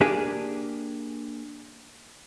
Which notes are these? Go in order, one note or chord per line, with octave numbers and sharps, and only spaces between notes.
A#3 D4 G4 G#4